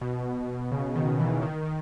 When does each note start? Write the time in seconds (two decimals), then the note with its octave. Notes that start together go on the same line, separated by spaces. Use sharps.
0.01 B2
0.72 C#3
0.96 D#3
1.19 E3
1.42 D#3
1.65 D#3